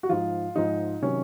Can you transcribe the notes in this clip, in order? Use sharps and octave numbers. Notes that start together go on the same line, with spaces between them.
F#4
G#2 F3 F4
G#2 F3 D#4
C3 D#3 F#3 C#4